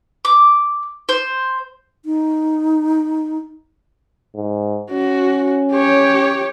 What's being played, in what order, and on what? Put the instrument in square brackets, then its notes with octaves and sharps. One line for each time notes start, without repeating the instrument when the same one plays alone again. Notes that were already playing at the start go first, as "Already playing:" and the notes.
[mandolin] D6
C5
[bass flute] D#4
[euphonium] G#2
[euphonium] C#4 [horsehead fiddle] F#4
[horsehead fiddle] G4 C#5